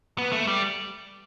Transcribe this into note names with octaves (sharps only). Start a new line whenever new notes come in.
B3
A3
G3